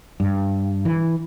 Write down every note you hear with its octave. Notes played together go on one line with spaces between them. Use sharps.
G2
E3